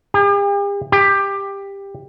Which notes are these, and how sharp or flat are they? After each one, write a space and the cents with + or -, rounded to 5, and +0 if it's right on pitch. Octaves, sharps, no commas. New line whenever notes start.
G4 +45
G4 +15